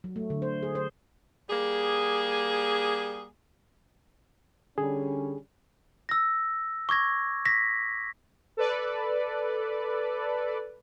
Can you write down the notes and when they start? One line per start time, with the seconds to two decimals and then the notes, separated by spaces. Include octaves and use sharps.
0.04 F#3
0.16 A3
0.30 D3
0.42 C5
0.63 G#4
0.75 C5
1.49 G3 A#3 G#4
4.78 D3 G3 C#4 G#4
6.09 E6 A#6
6.89 C#6 D6 G#6 A#6
7.45 A#6 B6
8.57 A4 B4 D5